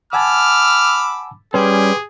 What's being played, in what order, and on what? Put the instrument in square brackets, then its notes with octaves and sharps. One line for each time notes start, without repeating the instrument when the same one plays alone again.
[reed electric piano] F#5 G#5 A5 [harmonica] B5 D6 E6 [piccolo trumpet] F6
[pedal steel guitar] G3 C#4 [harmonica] G4 [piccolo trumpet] G#4 [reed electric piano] B4 C6